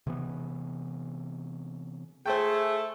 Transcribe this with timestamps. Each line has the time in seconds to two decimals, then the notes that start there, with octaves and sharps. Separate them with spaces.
0.07 C3 E3 B3
2.26 A3 G#4 C5 G5